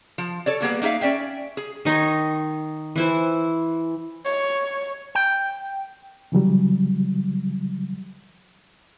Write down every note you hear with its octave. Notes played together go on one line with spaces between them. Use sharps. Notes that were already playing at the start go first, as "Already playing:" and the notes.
F3
A4 C#5 D5
G3 A#3 B3 G#4
A#3 D#4 G#4 E5 F5
C#4 D5 E5 G5
G#4
D#3 D#4 C#5 C6
E3 E4 C5
C#5
G5
C#3 E3 F#3 G3